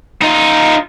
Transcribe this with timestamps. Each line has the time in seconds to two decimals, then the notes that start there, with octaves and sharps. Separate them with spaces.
0.22 D#4 F4